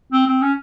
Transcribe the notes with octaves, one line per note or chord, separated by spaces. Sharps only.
C4
C4
C#4